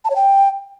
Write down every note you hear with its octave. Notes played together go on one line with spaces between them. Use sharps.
A5
C#5
G5